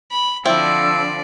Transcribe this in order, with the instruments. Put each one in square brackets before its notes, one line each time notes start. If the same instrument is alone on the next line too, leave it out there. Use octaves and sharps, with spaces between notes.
[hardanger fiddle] B5
[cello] D3 F3 [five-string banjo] C4 E4 [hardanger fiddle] D5 [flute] E6